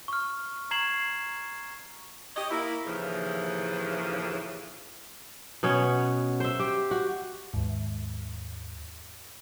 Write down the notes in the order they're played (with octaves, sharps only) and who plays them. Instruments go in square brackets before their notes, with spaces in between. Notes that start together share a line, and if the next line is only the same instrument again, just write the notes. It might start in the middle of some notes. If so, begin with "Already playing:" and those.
[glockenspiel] C#6 F6
A#5 C#6 G#6 C7 E7 F#7
[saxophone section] G4 C#5 D#5
A#3 E4
D#2 A2 C#3 E3 F3
[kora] B2 B3 C#4 C#5
C5 E5
G4
F#4
[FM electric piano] D#2 G#2